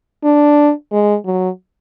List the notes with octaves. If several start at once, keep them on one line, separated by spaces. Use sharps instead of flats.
D4
G#3
F#3